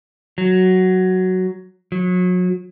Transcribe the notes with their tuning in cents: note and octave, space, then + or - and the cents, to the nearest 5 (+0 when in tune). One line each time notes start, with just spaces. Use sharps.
F#3 +5
F#3 -35